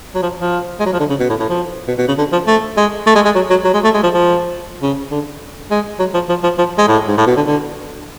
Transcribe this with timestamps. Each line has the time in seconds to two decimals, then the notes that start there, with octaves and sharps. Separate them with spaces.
0.15 F#3
0.23 F3
0.41 F3
0.80 G#3
0.86 F#3
0.93 F3
1.00 D3
1.10 C#3
1.20 B2
1.30 A2
1.40 A2
1.50 F3
1.88 B2
1.98 B2
2.08 C#3
2.18 D3
2.32 F3
2.47 A3
2.77 G#3
3.07 A3
3.15 G#3
3.25 G#3
3.35 F#3
3.50 F#3
3.65 F#3
3.74 G#3
3.84 A3
3.94 G#3
4.03 F3
4.14 F3
4.83 C#3
5.11 D3
5.71 G#3
5.99 F#3
6.14 F3
6.29 F3
6.43 F3
6.58 F3
6.78 G#3
6.88 A2
7.08 G#2
7.18 A2
7.27 B2
7.37 D3
7.47 D3